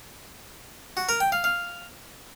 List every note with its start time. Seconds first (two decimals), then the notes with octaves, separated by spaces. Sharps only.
0.97 F#4
1.09 A#4
1.20 G5
1.32 F5
1.44 F5